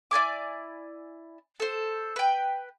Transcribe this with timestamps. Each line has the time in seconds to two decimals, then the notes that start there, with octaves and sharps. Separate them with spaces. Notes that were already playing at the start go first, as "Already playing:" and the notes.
0.11 E4 D5 G#5 D6
1.60 A4 C5
2.16 B4 G5